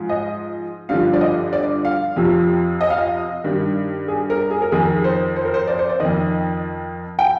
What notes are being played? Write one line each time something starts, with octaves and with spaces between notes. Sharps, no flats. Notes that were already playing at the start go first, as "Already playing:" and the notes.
Already playing: G#2 F3
D#5
G2 D3 F3 F5
D5
D#5
D5
F5
F2 C3 F3
D#5
F5
D#5
G2 D#3
G#4
A#4
G#4
A#4
F2 D#3 G#4
C5
C5
A#4
C5
D5
C5
D5
F2 D#3 D#5
G5